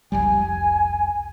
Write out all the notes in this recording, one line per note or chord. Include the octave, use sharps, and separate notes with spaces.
F1 C2 G3 G#5